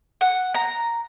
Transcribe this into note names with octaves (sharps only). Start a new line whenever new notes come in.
F#5
A#5